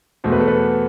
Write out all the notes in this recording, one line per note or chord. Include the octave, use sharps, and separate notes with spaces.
E2 B2 A3 C5
B4
A4
B3 B4